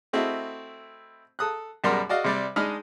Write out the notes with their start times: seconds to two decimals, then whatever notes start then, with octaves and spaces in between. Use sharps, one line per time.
0.13 A3 C4 E4 F#4 D#5
1.39 A4 D#6 F#6
1.84 F#2 B2 G3 A#4 C6
2.09 F#4 D5 D#5 F5
2.24 C3 G3 D5
2.56 G#3 D4 D#4 D#5 B5 F6